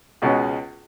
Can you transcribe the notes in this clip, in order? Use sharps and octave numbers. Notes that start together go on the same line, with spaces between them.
C#2 B2 G#3 C#4